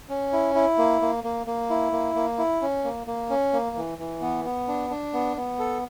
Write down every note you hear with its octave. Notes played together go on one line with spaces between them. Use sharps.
C#4
E4
E4
A#3
A#3
A#3
A#3
E4
A#3
A#3
E4
C#4
A#3
A#3
C#4
A#3
E3
E3
B3
B3
D4
D4
B3
B3
A4